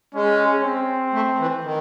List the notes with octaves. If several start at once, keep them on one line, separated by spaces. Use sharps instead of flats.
G#3 C#4
C4
A3
E3
D#3